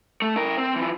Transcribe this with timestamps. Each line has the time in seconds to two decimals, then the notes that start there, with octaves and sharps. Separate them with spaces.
0.22 A3
0.36 E4 A#4
0.58 C4
0.76 E3 F3